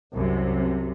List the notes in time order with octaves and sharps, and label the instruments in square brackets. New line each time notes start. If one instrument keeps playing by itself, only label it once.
[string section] C2 F#2 C3